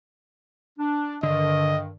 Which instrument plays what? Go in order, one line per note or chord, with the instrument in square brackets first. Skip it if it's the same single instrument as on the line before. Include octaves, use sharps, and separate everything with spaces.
[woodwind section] D4
[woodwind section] G2 D#3 [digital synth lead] D3 [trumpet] D#5